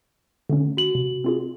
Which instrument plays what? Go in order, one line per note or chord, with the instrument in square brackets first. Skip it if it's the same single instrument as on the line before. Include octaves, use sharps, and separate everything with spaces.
[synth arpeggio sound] D3 A3 C#4
[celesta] F#4 F#7
[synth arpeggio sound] C3
C4 F4 G#4